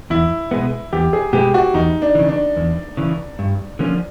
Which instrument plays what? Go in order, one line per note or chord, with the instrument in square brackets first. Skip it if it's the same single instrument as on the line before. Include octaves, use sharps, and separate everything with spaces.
[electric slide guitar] E2 [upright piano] E4
[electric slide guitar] B2 G#3 B3
[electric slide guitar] E2 [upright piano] G4
[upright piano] G#4
[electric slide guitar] B2 G#3 B3 [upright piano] G4
[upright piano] F#4
[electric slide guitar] E2 [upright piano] D#4
[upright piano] D4
[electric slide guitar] C#3 E3
[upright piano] D4
[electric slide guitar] E2
C#3 E3
G2
D3 F3 A#3 C#4